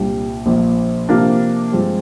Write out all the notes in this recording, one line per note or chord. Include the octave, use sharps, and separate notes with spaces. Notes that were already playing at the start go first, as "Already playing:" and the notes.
Already playing: C2 A#2 G3 D4 G4
A#1 A#2 F3
C3 F3 A#3 D4
G2 F3 G#3 C4